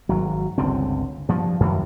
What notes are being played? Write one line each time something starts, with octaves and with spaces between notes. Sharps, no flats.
G#1 F#3
G1 C#2 D3 C4
G2 F3
F#2 A2 D#3